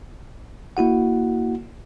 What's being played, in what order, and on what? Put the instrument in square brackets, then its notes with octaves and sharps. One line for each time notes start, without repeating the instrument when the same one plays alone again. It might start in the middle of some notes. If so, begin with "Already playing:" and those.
[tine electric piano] A#3 E4 F#4 F#5